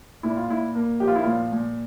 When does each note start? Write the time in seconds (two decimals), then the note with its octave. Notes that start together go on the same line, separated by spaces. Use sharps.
0.23 A#2 E4
0.37 F4
0.49 A#2 E4
0.75 A#3
1.00 F3 G4
1.08 F4
1.16 E4
1.23 A#2 F4
1.52 A#2